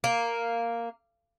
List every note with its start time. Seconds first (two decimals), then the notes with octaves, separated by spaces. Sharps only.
0.04 A#3